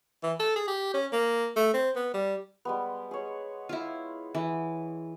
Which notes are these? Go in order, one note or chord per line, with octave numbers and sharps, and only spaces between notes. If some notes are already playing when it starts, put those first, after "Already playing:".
E3
A4
G#4
G4
C#4
A#3
A3
C4
B3
G3
G3 G#3 B3
G#4 C#5
E4 F4
E3